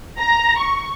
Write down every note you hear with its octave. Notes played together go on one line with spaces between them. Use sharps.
A#5
C#6